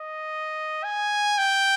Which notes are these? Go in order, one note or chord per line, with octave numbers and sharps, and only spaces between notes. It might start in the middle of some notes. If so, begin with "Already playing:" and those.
Already playing: D#5
G#5
G5